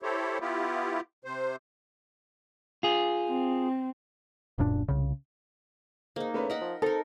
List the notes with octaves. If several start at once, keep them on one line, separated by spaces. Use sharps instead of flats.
E4 G4 A4 C5 C#5
B3 E4 F4 G4
C3 C5
F4 G#4
C4
D1 F#2 A#2 D4
C2 C#3
G#2 A#3 D#4
E2 A3 C#4 B4
A#4 D#5 F#5 B5
F3
C4 D#4 A4 A#4